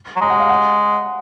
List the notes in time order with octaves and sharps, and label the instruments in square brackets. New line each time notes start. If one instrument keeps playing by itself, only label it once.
[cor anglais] F#3
[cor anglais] G#3 [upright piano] A#5
[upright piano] F#5
F5
F#5